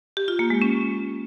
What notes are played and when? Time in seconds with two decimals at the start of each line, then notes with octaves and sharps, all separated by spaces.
0.17 G4
0.28 F4
0.39 A#3
0.50 G#3
0.62 C#4